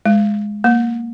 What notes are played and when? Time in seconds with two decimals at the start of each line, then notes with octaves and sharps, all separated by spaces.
0.05 G#3
0.64 A#3